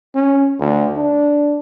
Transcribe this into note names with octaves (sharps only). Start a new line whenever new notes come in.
C#4
D2
D4